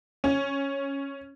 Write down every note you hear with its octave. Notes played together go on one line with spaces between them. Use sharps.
C#4